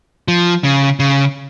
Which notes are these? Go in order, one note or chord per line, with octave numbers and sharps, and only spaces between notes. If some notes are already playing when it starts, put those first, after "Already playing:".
F3
C#3
C#3